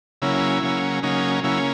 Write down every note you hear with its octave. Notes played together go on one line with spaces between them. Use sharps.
C#3 F#3 A#3 C#4 E4
C#3 F#3 A#3 C#4
C#3 F#3 A#3 C#4 D#4
C#3 F#3 A#3 C#4 E4